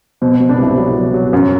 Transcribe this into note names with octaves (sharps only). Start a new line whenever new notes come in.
B2 C4
B2 C4
B3 D4
C2 C4 E4
F#3
F#3
F#3
F#2